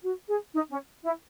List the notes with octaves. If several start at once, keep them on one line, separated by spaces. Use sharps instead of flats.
F#4
G#4
D#4
C#4
E4